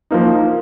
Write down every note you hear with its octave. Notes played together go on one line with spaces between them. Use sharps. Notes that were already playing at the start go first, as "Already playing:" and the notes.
F3 A#3 D#4